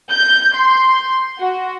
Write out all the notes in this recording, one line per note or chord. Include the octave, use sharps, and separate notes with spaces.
G6
C6
F#4